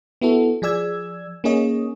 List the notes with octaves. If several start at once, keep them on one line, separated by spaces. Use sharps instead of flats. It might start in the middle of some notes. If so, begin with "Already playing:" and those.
B3 E4 F#4 A4
F3 G#4 D5 E6 G#6
A#3 C#4 D#4 G#4 C#5 D#5